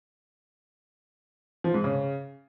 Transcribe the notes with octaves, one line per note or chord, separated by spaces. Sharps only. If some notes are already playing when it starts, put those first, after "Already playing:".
F3
G#2
C#3